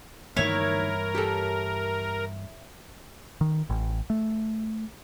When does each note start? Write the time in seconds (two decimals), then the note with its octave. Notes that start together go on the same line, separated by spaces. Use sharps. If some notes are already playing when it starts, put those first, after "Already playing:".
0.36 D2 G2 D#3 E3 A#3 E4 A#4 C#5
1.15 G4 A4
3.41 D#3
3.70 A1
4.10 A3